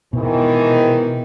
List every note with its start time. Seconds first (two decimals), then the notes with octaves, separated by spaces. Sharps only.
0.13 G#2 B2 D#3 E3